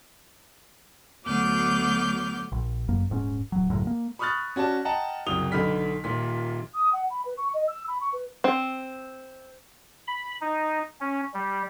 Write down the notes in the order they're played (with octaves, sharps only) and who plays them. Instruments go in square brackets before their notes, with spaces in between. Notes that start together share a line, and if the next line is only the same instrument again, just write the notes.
[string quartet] D2 F#3 B3 D6 F6 G6
[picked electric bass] A#1
G1 F#2 A#3
D#1 G#2 C3 C#4
D1 A#1 F#3
G#1 C#2 F#2 A2
A#3
[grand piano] B5 C#6 D#6 F6 F#6 A6
C#4 F#4 D5 A5
D#5 F#5 G5 A5 A#5
F#1 C2 D#6 F7 G7
B1 D3 B5 F6 B6
D#1 A#2 B6
[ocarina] D#6
F#5
B5
B4
C#6
D#5
E6
B5
C#6
B4
[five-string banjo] C4
[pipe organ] B5
D#4
C#4
G3